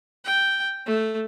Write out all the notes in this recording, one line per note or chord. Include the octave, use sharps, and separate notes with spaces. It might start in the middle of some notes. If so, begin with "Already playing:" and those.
G5
A3